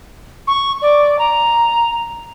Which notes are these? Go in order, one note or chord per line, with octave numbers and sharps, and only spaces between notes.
C#6
D5
A#5